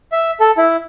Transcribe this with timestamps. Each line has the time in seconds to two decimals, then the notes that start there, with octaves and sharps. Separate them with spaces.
0.12 E5
0.40 A4
0.57 E4